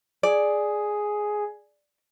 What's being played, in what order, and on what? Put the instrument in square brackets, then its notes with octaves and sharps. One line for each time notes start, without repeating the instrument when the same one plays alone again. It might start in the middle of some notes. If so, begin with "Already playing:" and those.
[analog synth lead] G#4 [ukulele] D5